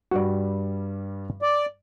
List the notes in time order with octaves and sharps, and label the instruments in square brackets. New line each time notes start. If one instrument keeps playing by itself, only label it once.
[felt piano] G2 G3 [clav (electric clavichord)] F#4 D5
[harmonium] D5